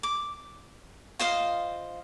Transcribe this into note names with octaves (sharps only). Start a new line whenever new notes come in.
D6
F4 C5 D#5 F5